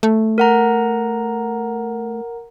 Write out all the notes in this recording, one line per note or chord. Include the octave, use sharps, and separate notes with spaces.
A3
A#4 F#5 A#5